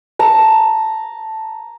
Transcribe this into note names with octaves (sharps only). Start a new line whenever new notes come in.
A5 A#5